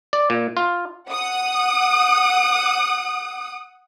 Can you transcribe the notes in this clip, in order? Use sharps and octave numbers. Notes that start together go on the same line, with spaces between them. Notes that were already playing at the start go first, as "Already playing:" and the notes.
D5
A#2
F4
F#5 D#6